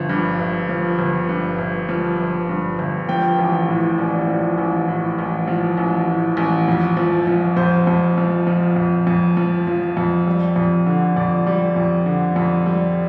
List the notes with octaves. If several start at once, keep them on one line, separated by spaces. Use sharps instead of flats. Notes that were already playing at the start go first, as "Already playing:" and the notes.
Already playing: G1 F3
G2
G1
F3
G1
G2
G1
F3
G1
G2
G1
F3 G5
A1
A2
A1 D5
F3
A1
A2
A1
F3
A1
A2
A1
F2
F3
F3
F2 C5
F2
F3
F3
F2
F2
F3
F3
F2
G3
F2
D3
F2 D5
G3
F2
D3
F2
G3